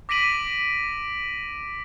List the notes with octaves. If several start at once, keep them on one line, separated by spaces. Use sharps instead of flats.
D6 A#6 B6 D7 D#7 F#7